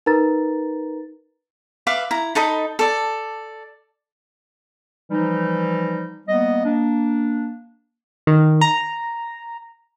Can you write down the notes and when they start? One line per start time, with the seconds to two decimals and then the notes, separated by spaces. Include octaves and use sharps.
0.06 D#4 A#4 B4 A#5 A6
1.87 B4 E5 F5 D6
2.11 E4 A#5
2.35 D#4 A4 D#5 B5
2.79 A4 D5
5.10 E3 F3 G3 D#4
6.28 G3 A#3 B3 D#5
6.65 A#3 D4
8.27 D#3
8.61 A#5